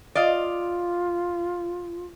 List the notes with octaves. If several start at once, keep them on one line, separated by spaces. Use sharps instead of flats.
F4 D5 D#5 F5